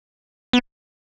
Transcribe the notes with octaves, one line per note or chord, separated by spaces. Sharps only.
B3